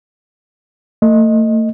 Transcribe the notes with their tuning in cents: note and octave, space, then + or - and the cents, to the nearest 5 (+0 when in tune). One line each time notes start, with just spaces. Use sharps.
A3 +35 D#5 +0